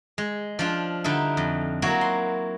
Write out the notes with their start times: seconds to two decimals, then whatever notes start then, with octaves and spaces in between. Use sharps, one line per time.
0.18 G#3
0.59 F3 D4 F4
1.04 D3 G3 D#4 E4
1.37 F2
1.82 F#3 A#3 E4 F#4
2.01 C6